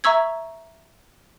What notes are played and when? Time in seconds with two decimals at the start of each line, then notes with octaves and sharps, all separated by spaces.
0.04 E5 A#5 C#6 E6 G#6